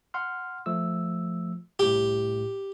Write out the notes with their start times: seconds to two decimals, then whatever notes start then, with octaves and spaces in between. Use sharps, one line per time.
0.14 F#5 C6 F6
0.66 F3 A3 E6
1.79 C2 A2 G4